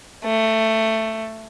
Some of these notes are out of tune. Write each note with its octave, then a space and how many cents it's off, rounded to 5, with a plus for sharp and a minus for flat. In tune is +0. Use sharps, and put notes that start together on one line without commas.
A3 +10